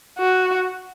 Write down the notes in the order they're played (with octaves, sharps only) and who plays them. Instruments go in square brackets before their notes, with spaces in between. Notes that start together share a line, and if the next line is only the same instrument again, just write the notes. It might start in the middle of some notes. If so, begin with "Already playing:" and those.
[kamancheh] F#4